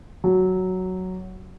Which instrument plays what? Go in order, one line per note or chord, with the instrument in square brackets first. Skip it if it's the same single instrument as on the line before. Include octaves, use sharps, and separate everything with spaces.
[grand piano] F#3